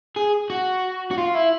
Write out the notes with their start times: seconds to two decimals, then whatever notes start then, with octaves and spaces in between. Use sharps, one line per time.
0.16 G#4
0.50 F#4
1.11 F#4
1.18 F4
1.35 E4